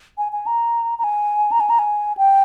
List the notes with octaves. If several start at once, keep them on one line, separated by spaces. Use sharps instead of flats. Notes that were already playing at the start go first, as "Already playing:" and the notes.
G#5
G#5
A#5
A#5
G#5
A#5
G#5
A#5
G#5
G5